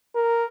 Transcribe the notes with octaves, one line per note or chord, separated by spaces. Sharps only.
A#4